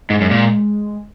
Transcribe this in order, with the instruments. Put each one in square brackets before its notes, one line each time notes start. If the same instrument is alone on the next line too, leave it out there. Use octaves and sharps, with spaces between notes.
[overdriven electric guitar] G#2 [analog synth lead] G#3
[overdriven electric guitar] F#2
A#2